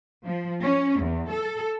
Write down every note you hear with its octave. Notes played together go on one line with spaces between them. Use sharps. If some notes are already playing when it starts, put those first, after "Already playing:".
F3
C#4
E2
A4